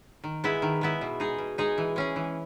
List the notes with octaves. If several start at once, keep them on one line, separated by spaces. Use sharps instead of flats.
D#3
G#3 B3 E4
D#3
G#3 B3 E4
B2
G#3 D#4 G#4
B2
G#3 D#4 G#4
E3
G#3 C#4 G#4
E3